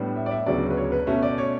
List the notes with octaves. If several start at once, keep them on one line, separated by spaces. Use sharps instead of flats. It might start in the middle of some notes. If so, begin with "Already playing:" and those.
Already playing: A2 G3 B3 D4
E5
D5
E5
D2 C#3 F#3 B3 D4 D5
B4
C#5
B4
B2 A3 C#4 E5
D5
C#5